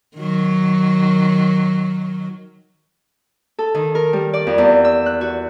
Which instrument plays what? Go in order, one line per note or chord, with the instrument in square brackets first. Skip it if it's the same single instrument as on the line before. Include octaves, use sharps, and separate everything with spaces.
[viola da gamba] D#3 F#3
[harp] A4
D#3
A#4
G3
D5
F2
E2
E6
F#6
F#4